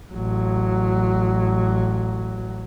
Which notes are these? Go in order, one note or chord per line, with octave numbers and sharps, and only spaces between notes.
A1 F#3